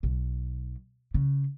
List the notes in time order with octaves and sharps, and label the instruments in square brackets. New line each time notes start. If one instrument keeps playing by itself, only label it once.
[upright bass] B1
C#3